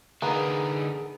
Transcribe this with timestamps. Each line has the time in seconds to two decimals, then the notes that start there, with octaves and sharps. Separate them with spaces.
0.22 D3 A#3 B3 D#4 G#4